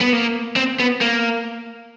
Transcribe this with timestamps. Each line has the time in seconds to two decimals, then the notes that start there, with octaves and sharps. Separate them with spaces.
0.01 B3
0.13 A#3
0.56 C4
0.80 B3
1.01 A#3